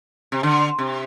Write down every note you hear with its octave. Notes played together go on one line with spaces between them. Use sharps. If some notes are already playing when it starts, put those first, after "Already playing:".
C3
D3
C3